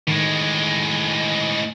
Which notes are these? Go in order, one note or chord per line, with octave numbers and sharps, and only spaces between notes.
A2 D#3 G#3